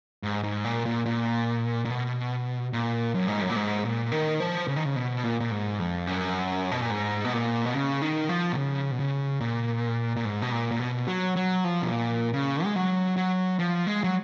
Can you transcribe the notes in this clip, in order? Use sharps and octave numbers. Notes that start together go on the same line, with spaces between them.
G#2
G#2
A#2
A#2
A#2
A#2
B2
A#2
F#2
G#2
F#2
A#2
G#2
A#2
D#3
F3
C#3
D#3
C#3
B2
A#2
A#2
G#2
F2
F#2
B2
A#2
G#2
B2
A#2
B2
C#3
D#3
F3
B2
C#3
B2
C#3
A#2
A#2
G#2
B2
A#2
A#2
B2
F#3
F#3
F3
B2
A#2
C#3
G#3
F#3
F#3
F3
G#3
F#3